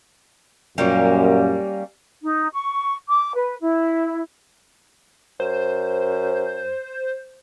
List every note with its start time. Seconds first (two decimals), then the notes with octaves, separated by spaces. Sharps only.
0.78 F#2 A#2 G3 A#3 C#4
2.23 D#4
2.53 C#6
3.08 D6
3.35 B4
3.61 E4
5.40 F#2 C5